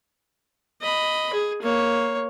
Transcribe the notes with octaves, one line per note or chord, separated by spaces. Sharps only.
D#5 B5
G#4
A#3 C#5